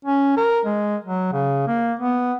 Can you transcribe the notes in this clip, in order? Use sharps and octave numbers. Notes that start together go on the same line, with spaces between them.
C#4
A#4
G#3
F#3
C#3
A#3
B3